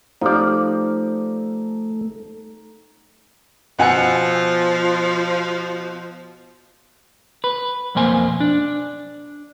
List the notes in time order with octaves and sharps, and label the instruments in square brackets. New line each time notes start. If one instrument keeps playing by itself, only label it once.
[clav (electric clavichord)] F3 D5 [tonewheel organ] A3 [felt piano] D#4 G4
[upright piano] B2 E6 C#7 [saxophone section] F3 [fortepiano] B3 F#5 G#5
[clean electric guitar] B4
B1 F2 A#3 C5 G#5
D4